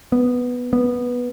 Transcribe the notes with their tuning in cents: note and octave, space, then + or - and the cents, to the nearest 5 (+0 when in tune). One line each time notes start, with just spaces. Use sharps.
B3 +0
B3 -10